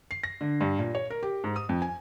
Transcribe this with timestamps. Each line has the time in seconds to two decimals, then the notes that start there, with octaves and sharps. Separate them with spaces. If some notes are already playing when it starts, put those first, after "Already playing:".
0.11 C7
0.23 A#6
0.41 D3
0.61 G2
0.79 A#2
0.95 C#5
1.10 A#4
1.23 G4
1.44 G#2
1.56 D#6
1.69 F2
1.82 G#5